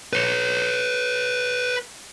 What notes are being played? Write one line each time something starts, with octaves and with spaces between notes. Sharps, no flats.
B4 C#5